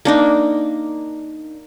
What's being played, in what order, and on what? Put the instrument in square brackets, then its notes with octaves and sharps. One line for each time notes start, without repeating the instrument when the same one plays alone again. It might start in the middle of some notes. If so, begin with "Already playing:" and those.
[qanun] A#3 D4 D#4